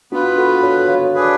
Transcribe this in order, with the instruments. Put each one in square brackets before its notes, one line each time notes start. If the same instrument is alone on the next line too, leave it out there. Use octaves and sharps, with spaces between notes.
[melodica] B3 F4 B4 [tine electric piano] D4 F#4
[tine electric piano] F#4 A4
A4 C#5
C#5 F5
[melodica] D4 G#4 B4